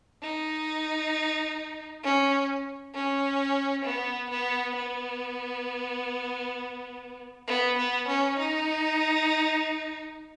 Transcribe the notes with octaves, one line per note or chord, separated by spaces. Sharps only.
D#4
C#4
C#4
B3
B3
B3
B3
B3
C#4
D#4